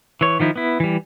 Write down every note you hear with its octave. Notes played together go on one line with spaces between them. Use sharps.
E3 C#5
D#3 F3 D#4 E4
B3 E4
E3 G3